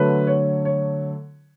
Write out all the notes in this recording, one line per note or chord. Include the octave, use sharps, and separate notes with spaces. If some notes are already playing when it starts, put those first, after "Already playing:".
Already playing: D3 F#3 A3 B4
C#5
C#5